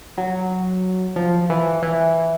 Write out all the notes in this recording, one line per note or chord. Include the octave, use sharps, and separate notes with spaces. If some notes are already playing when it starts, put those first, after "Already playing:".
F#3
F3
E3
E3